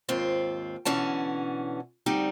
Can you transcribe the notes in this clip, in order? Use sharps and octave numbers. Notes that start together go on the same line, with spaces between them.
D#2 G#2 C4 F4
B2 D3 E3 C#4 A5
D2 G3 C4 D#4